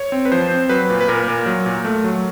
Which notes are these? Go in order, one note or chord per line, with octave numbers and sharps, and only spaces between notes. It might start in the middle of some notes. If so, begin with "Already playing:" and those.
Already playing: C#5
C4
B4
F3 C5
C4
F#3 B4
A#2
B4
A#2 A#4
A#2
F#3
A#2
A3
F#3